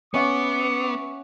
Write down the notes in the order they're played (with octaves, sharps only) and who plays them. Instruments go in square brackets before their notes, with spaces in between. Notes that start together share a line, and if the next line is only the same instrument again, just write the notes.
[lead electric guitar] B3 [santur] C#4 E5 F#5 [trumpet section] D6 [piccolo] C#7